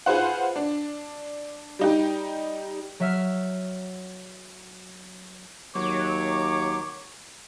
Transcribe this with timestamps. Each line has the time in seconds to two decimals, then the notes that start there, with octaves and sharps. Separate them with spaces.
0.06 F4 G#4 B4 C5 F#5
0.56 D4
1.79 G3 D#4 G4
3.00 F#3 E5 F6
5.76 D#2 F#3 C#5 D6